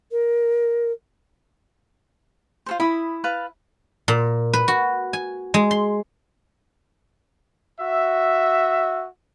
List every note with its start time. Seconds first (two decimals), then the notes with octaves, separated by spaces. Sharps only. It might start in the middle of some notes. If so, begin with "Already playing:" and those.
0.11 A#4
2.66 F4 A4 C5
2.80 E4 B5 D#6
3.24 B4 F5 A5
4.08 A#2
4.53 B4
4.68 F#4
5.13 G#5
5.54 G#3
5.71 C6
7.80 F#4 E5